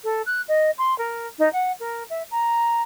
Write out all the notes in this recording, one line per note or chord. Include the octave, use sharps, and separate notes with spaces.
A4
F#6
D#5
C6
A#4
D#4
F#5
A#4
E5
A#5